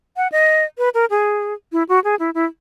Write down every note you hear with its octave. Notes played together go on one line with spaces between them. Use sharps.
F#5
D#5
B4
A#4
G#4
E4
F#4
G#4
E4
E4